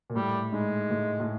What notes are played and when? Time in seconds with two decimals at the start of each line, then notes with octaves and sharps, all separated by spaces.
0.10 A#2
0.16 A2 G3
0.52 G#2 G#3
0.91 A2
1.20 A2